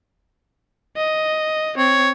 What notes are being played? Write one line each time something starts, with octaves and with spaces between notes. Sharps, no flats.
D#5
C4 C#5